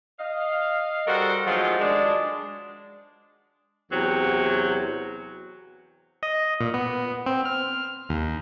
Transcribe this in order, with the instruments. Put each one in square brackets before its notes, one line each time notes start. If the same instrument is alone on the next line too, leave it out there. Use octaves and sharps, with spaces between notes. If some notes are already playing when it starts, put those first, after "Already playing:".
[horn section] D#5 F5
G3 F#4 A4 A#4 C5 F#5
D#3 F3 F#3 G#3 A3 F4
G#3 D4
[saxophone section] E2 C3 F#3
[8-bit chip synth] D#5
A#2
B3
C4
F6
D#2